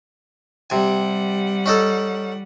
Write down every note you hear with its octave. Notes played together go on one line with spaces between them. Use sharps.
C3 G3 F#5 G#5
C#4 D#4 A4